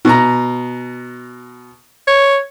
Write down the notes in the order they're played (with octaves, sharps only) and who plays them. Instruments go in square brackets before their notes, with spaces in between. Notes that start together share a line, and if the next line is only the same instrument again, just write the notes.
[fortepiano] B2 A#5
[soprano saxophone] C#5